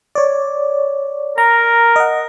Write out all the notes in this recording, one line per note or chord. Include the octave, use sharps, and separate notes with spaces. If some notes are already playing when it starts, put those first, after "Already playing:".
C#5 D5
A#4 A#5
D#5 F#5